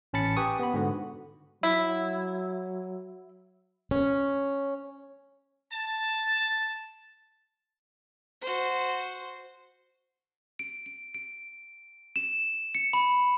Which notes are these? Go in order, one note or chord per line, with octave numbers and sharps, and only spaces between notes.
A1 C#4 A5 B5 A6 C#7
G4 B4 G5 G#5 C#6 D#6
B3 B5
G#2 D3 F#4
F#3 E4
C#4
A5
F#4 C5
D7
D7
D7
E7
C#7
B5